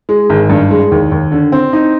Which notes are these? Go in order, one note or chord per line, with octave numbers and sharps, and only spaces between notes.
G#3
G#1
G2
G#3
D#2
D#2
D3
C4
D#4